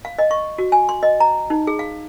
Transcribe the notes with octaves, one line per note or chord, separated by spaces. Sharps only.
F5
D#5
C#6
F#4
G#5
C6
D#5
A#5
D#4
G#4
F5